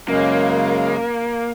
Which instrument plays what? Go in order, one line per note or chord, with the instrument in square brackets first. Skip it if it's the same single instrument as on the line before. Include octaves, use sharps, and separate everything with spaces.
[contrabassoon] F#2 [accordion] C#3 G#3 [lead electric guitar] A#3